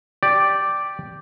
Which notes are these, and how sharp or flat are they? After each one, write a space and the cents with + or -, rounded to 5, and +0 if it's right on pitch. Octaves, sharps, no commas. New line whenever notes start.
G4 +0 D5 +0